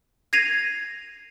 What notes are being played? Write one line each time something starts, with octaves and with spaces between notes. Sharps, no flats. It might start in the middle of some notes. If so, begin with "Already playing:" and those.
G#6 A#6 C7 D#7 F7